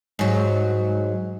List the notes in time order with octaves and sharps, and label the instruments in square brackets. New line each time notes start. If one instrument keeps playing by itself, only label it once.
[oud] G#2 F#3